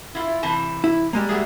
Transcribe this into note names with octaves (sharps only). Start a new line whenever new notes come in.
E4 F4
C3 E3 A5
E4
G3 G#3 A#3
F#3 A3 G#4